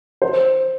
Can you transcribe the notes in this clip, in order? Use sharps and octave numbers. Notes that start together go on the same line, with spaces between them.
C5